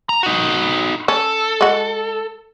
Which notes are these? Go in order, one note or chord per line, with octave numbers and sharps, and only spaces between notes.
A#5
D#4 F#4
C#4 A4
G#3 F#4